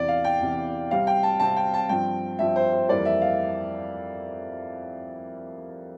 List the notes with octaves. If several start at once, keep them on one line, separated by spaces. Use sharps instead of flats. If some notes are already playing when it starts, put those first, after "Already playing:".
Already playing: E2 C3 E3 D5
F5
G5
E2 C3 E3
C3 G3 C4 F5
G5
A5
C3 G3 C4 A5
G5
A5
G2 F3 C4 G5
G2 F3 C4 E5
C5
C5
F2 E3 G3 A#3 D5
E5
F5